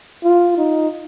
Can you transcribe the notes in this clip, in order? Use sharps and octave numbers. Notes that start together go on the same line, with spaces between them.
F4
D#4